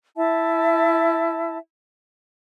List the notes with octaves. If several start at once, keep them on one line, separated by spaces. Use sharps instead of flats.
E4 E5 A5